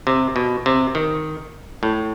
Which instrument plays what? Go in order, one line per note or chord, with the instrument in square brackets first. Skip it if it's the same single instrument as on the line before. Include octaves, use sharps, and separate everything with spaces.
[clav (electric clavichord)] C3
B2
C3
D#3
A2